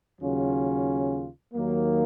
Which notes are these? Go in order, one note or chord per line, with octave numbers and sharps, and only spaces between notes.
D#2 C#3 F#3 C#4 F4
D#2 D#3 F#3 A#3